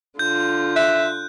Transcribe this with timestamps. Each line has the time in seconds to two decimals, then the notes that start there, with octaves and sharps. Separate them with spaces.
0.19 D3 F4 G6
0.76 E5 F#6